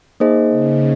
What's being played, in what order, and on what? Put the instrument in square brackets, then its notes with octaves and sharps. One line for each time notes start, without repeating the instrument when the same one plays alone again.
[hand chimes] A#3 D#4 G#4 C5 D#5
[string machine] C#3